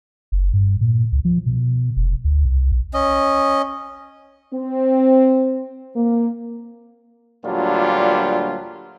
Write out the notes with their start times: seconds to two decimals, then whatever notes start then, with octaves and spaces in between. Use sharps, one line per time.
0.32 F#1
0.53 G2
0.81 A#2
1.12 C#2
1.25 F3
1.46 B2
1.96 F1
2.24 D2
2.45 C2
2.72 B1
2.94 C#4 D#5
4.54 C4
5.96 A#3
7.44 D2 A#2 F#3 G3 D4 F4